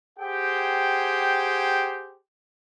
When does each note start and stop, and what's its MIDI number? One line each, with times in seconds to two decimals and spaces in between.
0.19 2.15 67
0.19 2.15 68
0.19 2.15 72
0.19 2.15 78
0.19 2.15 79